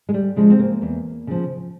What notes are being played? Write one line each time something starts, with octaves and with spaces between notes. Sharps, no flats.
G#3
G3
C#3 F3 G#3
C4
A#3
E2
C#3 F3